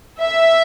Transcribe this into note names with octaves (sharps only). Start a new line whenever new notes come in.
E5